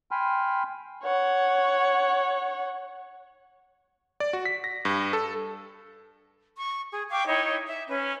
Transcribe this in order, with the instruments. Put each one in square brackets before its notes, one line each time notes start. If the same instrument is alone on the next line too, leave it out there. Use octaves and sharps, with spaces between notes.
[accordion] G5 G#5 B5 C6 F6
[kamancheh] C#5 F#5
[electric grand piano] D5
F#4
B6
A#6
G2
A4
[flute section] C#6
G#4
F5 G5 C#6 D6
D#4 E4 C#5
E5
C#4 B4